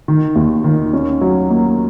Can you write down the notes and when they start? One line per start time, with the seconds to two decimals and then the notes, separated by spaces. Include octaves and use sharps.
0.08 D#3
0.36 D#2
0.64 D#3
0.93 C#4
1.21 F#3
1.50 A#3